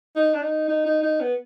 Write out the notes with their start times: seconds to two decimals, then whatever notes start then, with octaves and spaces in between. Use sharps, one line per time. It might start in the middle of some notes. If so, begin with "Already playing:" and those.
0.16 D#4
0.34 D4
0.41 D#4
0.68 D#4
0.86 D#4
1.03 D#4
1.21 B3